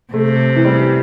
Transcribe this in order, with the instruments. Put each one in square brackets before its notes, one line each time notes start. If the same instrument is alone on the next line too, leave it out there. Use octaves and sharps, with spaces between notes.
[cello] C3 [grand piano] A3
[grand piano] E3
G3